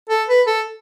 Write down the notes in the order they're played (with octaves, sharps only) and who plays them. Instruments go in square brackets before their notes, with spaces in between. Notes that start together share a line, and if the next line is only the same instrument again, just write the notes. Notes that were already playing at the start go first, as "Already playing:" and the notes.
[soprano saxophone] A4
B4
A4